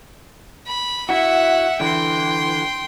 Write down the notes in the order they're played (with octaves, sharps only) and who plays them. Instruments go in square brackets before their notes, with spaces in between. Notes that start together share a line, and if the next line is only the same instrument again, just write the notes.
[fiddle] B5
[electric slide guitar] E4 F#4 [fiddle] E5 F#5
[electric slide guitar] D3 E3 [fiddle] G5 C6